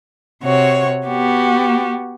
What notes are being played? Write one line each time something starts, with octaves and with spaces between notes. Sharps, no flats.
C3 F#4 C#5
B3 F#4 G4